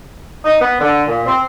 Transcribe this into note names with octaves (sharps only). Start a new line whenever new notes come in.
D#4
B3
D3
A#2
C4